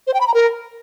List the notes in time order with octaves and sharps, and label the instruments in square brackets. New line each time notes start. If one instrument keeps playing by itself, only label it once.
[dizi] C5
G5
B5
A#5
A#4